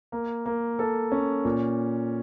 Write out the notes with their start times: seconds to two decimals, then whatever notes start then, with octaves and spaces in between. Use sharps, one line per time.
0.12 A#3
0.46 A#3
0.79 A4
1.12 C#4
1.45 A#2